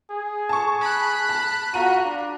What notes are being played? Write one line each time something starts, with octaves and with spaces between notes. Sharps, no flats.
G#4
A5 C#6
B5 F#6
A5
F4 F#4 A#5 D#7
D4